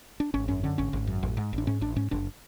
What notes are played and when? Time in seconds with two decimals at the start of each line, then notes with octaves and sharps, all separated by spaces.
0.20 D4
0.34 G#1 C#4
0.48 F#2 C#4
0.63 D3 C#4
0.78 G#1 C#4
0.93 G#1
1.07 F#2
1.23 A1
1.37 G#2
1.53 A1 D4
1.67 G#2 C#4
1.81 A1 D4
1.96 G#2 C#4
2.11 F#1 D4